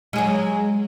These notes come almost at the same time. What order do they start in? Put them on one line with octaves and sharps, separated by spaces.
G#3 G#4 F#3